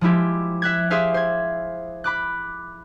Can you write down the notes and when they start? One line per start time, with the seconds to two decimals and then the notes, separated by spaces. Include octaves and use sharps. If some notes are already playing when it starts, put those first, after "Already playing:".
0.01 F3 G#3 E4 G4
0.62 E5 F#6 G#6
0.90 G4 G#4 C5 E5 F5
1.14 C5 G#6
2.04 B5 D6 F#6